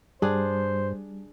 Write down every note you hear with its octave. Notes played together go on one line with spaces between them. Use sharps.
G2 G3 D4 G#4 C5